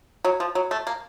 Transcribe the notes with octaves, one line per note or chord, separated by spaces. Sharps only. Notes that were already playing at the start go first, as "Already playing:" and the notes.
F#3
F3
F#3
A3
A#3